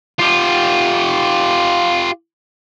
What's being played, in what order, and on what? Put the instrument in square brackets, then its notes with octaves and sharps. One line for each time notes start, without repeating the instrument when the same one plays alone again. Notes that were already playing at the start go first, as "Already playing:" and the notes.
[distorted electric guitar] F4 G4